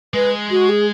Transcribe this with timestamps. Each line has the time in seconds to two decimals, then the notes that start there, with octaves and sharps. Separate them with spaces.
0.14 G#3 B4
0.51 F#4
0.69 G#4